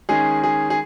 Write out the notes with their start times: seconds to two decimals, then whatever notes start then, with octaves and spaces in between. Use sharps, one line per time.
0.09 D#3 G#3 C#4 G#4
0.44 G#4
0.70 G#4